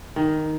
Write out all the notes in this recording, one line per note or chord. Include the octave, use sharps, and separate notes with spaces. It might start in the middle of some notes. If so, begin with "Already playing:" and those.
D#3